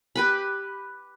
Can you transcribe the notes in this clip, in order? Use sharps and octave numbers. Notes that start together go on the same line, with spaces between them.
G4 B4 B5